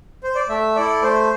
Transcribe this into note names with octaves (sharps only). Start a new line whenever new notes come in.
C5
D5
A3 E5
E4 A4 D5
A3 C5